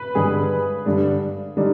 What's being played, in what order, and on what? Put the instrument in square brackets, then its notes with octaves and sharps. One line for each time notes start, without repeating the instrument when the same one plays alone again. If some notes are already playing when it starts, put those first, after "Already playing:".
Already playing: [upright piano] B4
[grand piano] G2 D3 G#3 [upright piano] G#4
[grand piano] G2 D3 G3 D4
[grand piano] D3 G3 D4 [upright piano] D#4